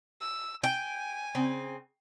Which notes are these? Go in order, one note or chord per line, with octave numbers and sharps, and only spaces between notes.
E6
G5 G#5
C#3 C4